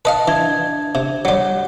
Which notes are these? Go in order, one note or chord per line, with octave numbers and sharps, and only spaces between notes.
B4 D#5 F5 A5
E3 D4 G#6
C3
F#3 G3 C#5 F#5
F#5